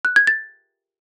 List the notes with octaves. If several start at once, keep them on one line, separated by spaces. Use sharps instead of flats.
F#6
G#6
A6